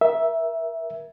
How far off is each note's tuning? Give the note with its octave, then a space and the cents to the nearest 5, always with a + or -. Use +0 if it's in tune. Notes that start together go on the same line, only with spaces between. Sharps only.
A#4 +30 E5 +0